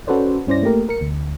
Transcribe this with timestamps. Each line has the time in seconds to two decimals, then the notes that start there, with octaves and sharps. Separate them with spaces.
0.07 C#4 F#4 A4 B4 C5 D5
0.47 G2 C#4 E4 C5 D5 A#6
0.63 A3 A#3 G4 A#4
0.89 A#4 C#7
1.01 D2